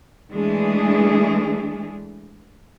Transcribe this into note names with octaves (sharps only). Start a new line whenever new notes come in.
E3 G#3 A3 D4 G#4